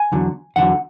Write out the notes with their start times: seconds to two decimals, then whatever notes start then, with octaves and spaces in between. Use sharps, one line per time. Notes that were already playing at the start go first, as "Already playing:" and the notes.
Already playing: G#5
0.12 E2 D3 F#3
0.56 E2 D3 F#3 F#5